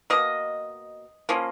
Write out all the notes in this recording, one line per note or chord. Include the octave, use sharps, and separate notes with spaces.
B2 A#3 D#5
F3 A#3 C#4